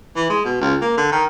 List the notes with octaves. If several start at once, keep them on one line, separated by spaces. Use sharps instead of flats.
E3
G#3
B2
C#2
A#3
D3
D#3